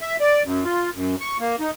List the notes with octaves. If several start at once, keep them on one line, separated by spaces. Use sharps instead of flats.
E5
D5
F#2
F4
F#2
C#6
A#3
D#4